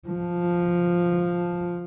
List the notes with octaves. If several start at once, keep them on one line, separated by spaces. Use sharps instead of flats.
F3